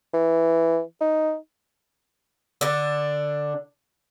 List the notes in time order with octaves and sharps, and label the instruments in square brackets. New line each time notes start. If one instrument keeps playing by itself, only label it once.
[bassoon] E3
D#4
[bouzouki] D3 D4